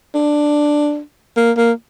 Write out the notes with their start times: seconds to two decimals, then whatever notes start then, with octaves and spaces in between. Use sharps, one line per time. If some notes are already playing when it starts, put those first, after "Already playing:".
0.14 D4
1.37 A#3
1.57 A#3